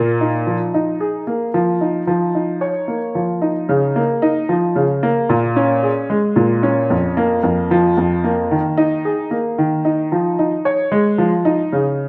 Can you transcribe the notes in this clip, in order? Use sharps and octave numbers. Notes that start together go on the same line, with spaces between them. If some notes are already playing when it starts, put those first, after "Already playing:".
Already playing: A#2 A#3
D#4
F3
D#4
G#4
A#3
F3
D#4
F3
D#4
C#5
A#3
F3
D#4
C#3
A#3
D#4
F3
C#3
A#3
A#2
C#4
G#4
G#3
A#2
C#4
F2
A#3
F2
F3
F2
A#3
D#3
D#4
G#4
A#3
D#3
D#4
F3
D#4
C#5
G#3
F3
D#4
C#3